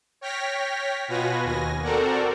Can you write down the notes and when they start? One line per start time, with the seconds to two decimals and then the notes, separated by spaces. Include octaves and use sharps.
0.21 C#5 G5 F6 A#6 B6
1.08 B2 F4 F#4 B4 G#5 A#6
1.44 D#2 G#5 A#6
1.82 C4 F#4 A4 A#4 D5 F#5